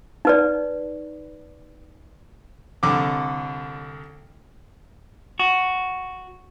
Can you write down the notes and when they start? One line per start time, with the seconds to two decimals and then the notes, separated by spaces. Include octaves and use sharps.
0.25 D#4 B4 D5
2.83 C2 D3 D6
5.40 F#4